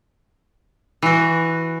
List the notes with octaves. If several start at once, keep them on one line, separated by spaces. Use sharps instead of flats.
E3 F#4